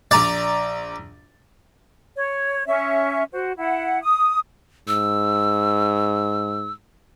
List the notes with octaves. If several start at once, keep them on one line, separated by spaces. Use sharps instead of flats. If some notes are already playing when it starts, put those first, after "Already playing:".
A#1 D5 A#5 A6
C#5
C#4 E5
F#4 C5
E4 F#5
D#6
G#2 E6